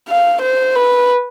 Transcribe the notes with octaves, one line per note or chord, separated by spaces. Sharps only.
F5
C5
B4